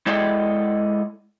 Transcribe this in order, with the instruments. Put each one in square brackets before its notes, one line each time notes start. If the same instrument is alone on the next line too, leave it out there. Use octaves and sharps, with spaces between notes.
[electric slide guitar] G#3 E4 A4 D5 D#5 G5